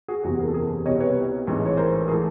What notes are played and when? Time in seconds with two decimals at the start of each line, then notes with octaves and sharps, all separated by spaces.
0.08 F#4 G#4
0.23 F#1 E2 C3 E3 F#4 G#4
0.40 G#4 A#4
0.48 A4
0.54 G#4 A#4
0.85 C2 B2 G3 C#5 D#5
1.00 B4 C#5
1.47 A1 G#2 E3
1.66 C#5
1.77 A#4 C5
2.08 G#4 A#4
2.12 E3 A3